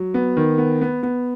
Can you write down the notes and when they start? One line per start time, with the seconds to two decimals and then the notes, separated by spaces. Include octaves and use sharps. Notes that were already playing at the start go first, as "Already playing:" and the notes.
Already playing: F#3
0.14 B3
0.37 D#3
0.58 B3
0.81 B3
1.03 B3